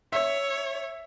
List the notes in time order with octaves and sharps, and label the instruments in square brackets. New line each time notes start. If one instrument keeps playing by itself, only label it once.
[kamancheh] C#5 [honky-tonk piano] E5